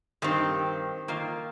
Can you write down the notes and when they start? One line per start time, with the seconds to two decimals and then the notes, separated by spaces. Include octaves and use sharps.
0.22 G2 D#3 C4 G4
1.08 D#3 A#3 F4